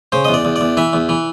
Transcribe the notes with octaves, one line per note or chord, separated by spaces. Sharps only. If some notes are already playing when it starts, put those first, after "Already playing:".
C#3 C5
E2 D#5
D5
E2
D5
E2
E3 E5
E2
E3